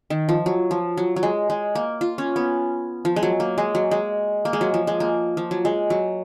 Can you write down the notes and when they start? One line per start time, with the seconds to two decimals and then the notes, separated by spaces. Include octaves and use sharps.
0.10 D#3
0.29 F3
0.46 F#3
0.71 F3
0.97 F#3
1.16 F#3
1.23 G#3
1.50 G#3
1.75 A#3
2.01 F4
2.18 C#4
2.36 B3
3.05 F3
3.16 G#3
3.23 F#3
3.40 A#3
3.58 G#3
3.75 F#3
3.91 G#3
4.45 A#3
4.53 G#3
4.61 F#3
4.74 F3
4.87 G#3
5.00 A#3
5.37 F3
5.51 F#3
5.65 G#3
5.90 F#3